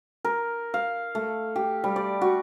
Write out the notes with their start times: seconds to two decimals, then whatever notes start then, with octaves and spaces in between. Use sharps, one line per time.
0.25 A#4
0.74 F5
1.15 A3
1.56 G4
1.84 G3
1.96 D5
2.21 F#4